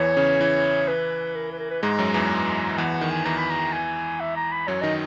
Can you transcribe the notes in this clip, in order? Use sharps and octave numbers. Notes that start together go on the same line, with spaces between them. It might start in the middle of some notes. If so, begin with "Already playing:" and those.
Already playing: E2 E3 C#5
C#3 C#4
E3 E4
B4
A#4
B4
A#4
B4
G#2 G#3 A#5
F#2 F#3
E2 E3
E2 E3 F#5
F#5
D#3
G#5
E2 E3 A#5
B5
A#5
G#5
E5
A#5
B5
F#2 F#3 C#5
D#3 D#4 D#5